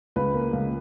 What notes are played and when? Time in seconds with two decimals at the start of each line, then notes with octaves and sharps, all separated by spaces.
0.16 C#2 B4
0.34 A#3
0.53 C#2